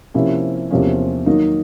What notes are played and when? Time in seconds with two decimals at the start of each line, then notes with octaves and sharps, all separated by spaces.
0.14 C3 F3 A#3 C#4 E4
0.71 E2 C3 F3 A#3 C#4
1.26 D#3 F#3 A#3 D#4